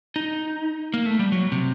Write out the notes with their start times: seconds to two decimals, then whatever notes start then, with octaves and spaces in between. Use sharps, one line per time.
0.16 D#4
0.94 A#3
1.06 A3
1.19 G3
1.32 F#3
1.52 C3